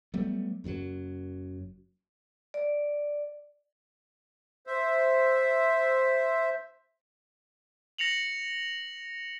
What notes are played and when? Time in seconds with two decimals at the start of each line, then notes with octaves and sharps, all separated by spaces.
0.14 F#3 G3 A3 B3
0.64 F#1 F#2 A2 F#3
2.54 D5
4.67 C5 E5
7.98 A#6 C#7 F7 F#7